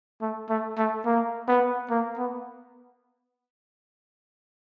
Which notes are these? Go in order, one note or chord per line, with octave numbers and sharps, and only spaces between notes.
A3
A3
A3
A#3
B3
A#3
B3